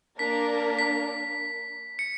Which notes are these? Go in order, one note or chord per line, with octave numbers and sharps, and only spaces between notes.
A#3 D4 A#4 B6
B6
C#7